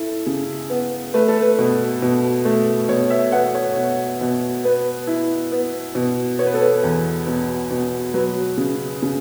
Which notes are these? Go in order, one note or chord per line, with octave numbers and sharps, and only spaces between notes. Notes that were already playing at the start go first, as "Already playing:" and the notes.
Already playing: E4 A4
C#3
B3
A3 B4
A4
B4
B2
B2
A3
B2 C#5
E5
B3 F#5
C#5
B2
B2
B3 B4
E4
B3
B2
B3 C#5
B4
A4
B4
E2
B2
B2
F#3 B4
C#3
C#3